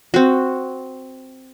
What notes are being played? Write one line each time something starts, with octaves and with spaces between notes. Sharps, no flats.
C4 F#4